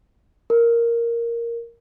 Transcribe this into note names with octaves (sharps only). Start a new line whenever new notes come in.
A#4